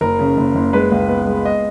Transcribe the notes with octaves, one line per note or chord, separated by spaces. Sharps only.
F#1 A#4
C#3
F#1
F#1
G#3 B4
C#2
B3
G#3
D#5